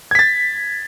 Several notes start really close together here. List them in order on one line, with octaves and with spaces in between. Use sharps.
G#6 B6 A6